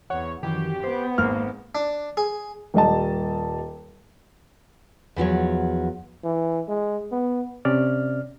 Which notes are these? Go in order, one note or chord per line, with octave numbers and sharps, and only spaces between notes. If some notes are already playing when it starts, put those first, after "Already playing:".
E2 C#5 F#5
F#2 D#3 E3 G4
B3 C5
G#1 A#3 F6
D4
G#4
D#1 G3 D#5 A5
E2 F3 F#3 C#5
E3
G#3
B3
C3 C#4 D5 F6